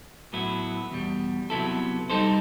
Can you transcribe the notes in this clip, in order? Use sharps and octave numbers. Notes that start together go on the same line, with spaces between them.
A2 F#3 B3 E4
E2 B2 G3
C3 F#3 B3 E4 A4
G3 D#4 A4 C5